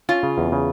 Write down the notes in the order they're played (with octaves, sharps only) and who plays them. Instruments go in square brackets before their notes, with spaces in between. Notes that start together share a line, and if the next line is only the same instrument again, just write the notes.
[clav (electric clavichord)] C#4 [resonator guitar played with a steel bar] F4
[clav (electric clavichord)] C#3
E2
C#3